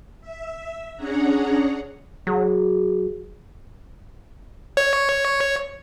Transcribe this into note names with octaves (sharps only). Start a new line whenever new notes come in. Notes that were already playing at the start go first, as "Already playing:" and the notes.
E5
C#4 D4 G#4 C#5 F#5 A#5
F#3 G#4
C#5